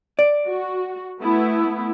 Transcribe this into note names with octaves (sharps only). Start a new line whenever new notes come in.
D5
F#4
A3 B3 E4